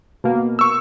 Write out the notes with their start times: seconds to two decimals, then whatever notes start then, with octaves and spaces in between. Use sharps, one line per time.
0.24 B2 A#3
0.59 C#6 E6